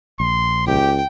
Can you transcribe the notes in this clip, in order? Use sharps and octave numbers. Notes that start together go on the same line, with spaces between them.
A#1 C6
C#2 G4 G5